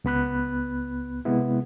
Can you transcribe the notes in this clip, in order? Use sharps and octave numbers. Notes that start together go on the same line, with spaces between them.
C#2 B3 B5 F#6
C3 G#3 B3 E4